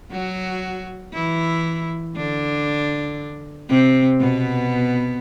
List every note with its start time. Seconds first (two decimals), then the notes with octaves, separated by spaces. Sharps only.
0.11 F#3 F#4
1.14 E3 E4
2.16 D3 D4
3.69 C3 C4
4.20 B2 B3